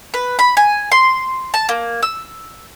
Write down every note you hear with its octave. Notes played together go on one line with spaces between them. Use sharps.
B4
B5
G#5
C6
A5
A#3
E6